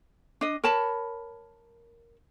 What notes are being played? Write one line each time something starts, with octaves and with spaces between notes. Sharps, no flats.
D4 D#5
A#4 C#5 A5 B5